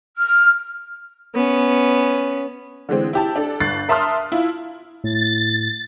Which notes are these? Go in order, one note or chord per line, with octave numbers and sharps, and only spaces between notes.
F6
B3 C#4
D3 E3 G#3 C4
E4 G4 A5
D4 A4
G1 F#6 A6 C7
A#4 E5 A5 C6 D#6 F6
E4 F4
A2 A6